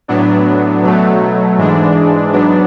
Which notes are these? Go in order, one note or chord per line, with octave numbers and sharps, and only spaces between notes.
A2 F#3 B3 D4
B2 F#3 A3
G#2 E3 G#3 D4
G#2 F#3 B3 D4